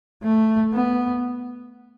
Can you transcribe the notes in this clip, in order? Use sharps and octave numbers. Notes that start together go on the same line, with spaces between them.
A3
B3